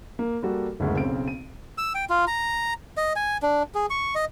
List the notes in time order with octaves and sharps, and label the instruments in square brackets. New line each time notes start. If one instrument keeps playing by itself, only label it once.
[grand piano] A#3
G3 A#3 F#4 A4
F#1 D2 G#3
B1 C#3 C4 D7
D#7
[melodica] E6
G5
F4
A#5
D#5
G#5
D4
G#4
C#6
D#5